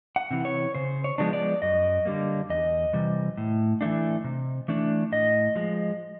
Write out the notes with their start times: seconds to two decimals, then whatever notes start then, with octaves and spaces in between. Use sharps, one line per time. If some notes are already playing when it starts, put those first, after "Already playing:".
0.16 F#5
0.31 C3 E3
0.45 C#5
0.75 C#3 C5
1.04 C#5
1.18 F3 G#3 B3 D4
1.33 D5
1.62 F#2 D#5
2.05 D3 G3 A#3
2.50 E2 D#5
2.93 C3 E3 G3
3.37 A2
3.81 E3 A3 D4
4.24 C3
4.68 E3 A3 D4
5.12 A2 D#5
5.56 F3 G#3